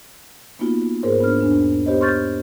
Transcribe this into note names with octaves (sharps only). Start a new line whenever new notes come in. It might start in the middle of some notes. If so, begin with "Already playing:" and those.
A#3 B3 D#4 F4 F#4
G#2 G#4 A#4 C5 C#5
B3 D4 F6
E2 D4
B3 G4 C5 C#5 D#5
C6 C#6 F6 G6 A6